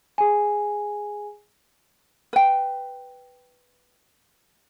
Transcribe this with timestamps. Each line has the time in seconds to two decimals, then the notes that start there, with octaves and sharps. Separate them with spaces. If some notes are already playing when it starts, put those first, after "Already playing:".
0.18 G#4 G#5
2.33 B4 G5